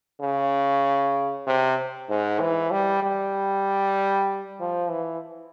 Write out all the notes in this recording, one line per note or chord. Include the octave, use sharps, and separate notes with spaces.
C#3
C3
G#2
E3
G3
G3
F3
E3